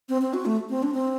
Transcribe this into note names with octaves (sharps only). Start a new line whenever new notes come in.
C4
C4
F#4
A3
C4
D4
C4